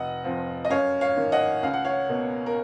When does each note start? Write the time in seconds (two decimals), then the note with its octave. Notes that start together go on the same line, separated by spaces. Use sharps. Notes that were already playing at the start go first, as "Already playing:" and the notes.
Already playing: F1 D#5 F#5
0.24 F2 F3
0.65 D#5
0.70 F#2 C#5 F5
1.01 C#5 F5
1.17 D#3 A#3
1.32 D#5 F#5
1.63 C#2 F5
1.73 F#5
1.85 C#5 F5
2.09 B2 A#3
2.46 A#4